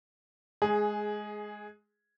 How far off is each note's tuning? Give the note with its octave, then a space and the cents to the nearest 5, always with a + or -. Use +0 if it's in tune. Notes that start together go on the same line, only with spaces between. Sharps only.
G#3 +15 G#4 +0